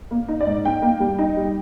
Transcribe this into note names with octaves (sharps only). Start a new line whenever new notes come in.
A#3
D#4
D5
G#2
D#4 G5
A#3
G3
D#4
G3